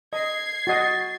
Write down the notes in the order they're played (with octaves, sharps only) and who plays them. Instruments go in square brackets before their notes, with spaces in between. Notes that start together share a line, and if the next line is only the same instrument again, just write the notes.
[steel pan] D#5 [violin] G#6 C7
[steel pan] F#4 D#5 [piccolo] A6